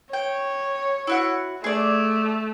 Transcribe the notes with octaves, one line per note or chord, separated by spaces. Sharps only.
C#5 G5
E4 F#4 F#5
A3 G#4 D5